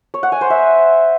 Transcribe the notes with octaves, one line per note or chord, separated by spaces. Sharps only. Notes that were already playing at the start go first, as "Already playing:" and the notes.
C#5
F#5
G#5
C5
E5